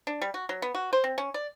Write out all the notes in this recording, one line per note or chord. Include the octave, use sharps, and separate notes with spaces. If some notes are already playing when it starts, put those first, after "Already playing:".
D4
G3
F#4
F#3
B3
F#4
C5
C4
C#4
D5